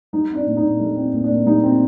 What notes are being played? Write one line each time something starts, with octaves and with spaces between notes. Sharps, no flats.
G3 D#4
C4 D4
A#2
D#4
A#2
G3 A4
C4
A#2
D4
A#2
G3 D#4
C4